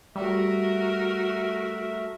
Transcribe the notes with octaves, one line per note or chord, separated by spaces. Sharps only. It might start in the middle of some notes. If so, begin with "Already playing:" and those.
G3 A3 F#4 A#4 E5